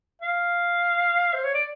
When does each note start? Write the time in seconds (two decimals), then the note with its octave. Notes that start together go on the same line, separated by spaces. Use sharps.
0.22 F5
1.34 C5
1.44 C#5
1.54 D5